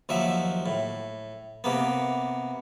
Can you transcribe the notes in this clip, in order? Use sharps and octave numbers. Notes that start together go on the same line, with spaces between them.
D#2 F3 F#3 E5
A2
C3 A#3 B3